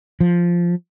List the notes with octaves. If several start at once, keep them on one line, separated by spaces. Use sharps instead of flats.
F3